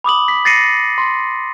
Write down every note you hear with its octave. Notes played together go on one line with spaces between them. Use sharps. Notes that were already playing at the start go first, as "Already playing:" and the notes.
B5 D6 D#6 F#7
B6
A6 A#6 C7 C#7 D#7
C6